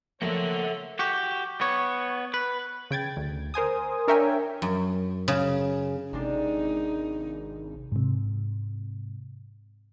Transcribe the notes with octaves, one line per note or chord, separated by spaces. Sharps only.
F3 A3 A#3 A4 C#5 E5 F#5 G5
F#4 G4
B3 C#5
B4
C#3 G5 G#6 A6
D2
A#4 C5 G#5 D#6
D4 A#4 C#5 E5 G5 G#5
F#2
C#3
G#1 C3 G#3 D4 D#4
G#2 C3